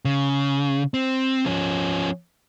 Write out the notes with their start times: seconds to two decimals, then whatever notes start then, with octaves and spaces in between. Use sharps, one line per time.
0.05 C#3
0.94 C4
1.46 F3 C#4